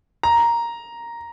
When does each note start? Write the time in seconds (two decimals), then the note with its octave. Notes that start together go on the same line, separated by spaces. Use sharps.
0.23 A#5